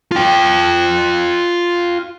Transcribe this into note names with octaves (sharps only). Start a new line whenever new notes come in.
F4 G5